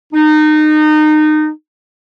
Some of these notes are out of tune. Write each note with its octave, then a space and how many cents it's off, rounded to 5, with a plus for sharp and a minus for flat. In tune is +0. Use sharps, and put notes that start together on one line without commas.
D#4 -25